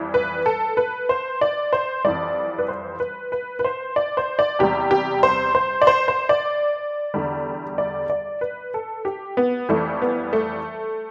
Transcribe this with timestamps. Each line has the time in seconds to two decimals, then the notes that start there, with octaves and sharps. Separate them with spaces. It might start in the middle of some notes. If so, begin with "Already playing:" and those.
Already playing: F2 E3 G3
0.14 B4
0.46 A4
0.77 B4
1.09 C5
1.41 D5
1.73 C5
2.05 F2 E3 G3 D5
2.59 B4
2.68 C5
3.00 B4
3.32 B4
3.59 B4
3.64 C5
3.96 D5
4.17 C5
4.39 D5
4.59 E2 C3 G3 G4
4.91 G4
5.23 C5
5.55 C5
5.82 D5
5.87 C5
6.08 C5
6.29 D5
7.14 E2 D3 G3
7.78 D5
8.10 D5
8.41 B4
8.74 A4
9.05 G4
9.37 B3
9.69 F2 E3 G3 A3
10.02 B3
10.33 A3